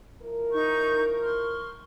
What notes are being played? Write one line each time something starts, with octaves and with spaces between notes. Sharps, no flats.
F3 E4 A#4
D#4 C#6 G6
C6 C#6 F6